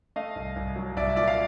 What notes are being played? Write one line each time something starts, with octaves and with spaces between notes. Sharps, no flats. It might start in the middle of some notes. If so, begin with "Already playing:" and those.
A3 D#5 F5
C2
C2
F#3
C2 D5 E5
A#2 D5 E5
F5